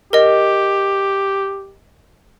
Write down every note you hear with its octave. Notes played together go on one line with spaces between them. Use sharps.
G4 A#4 D#5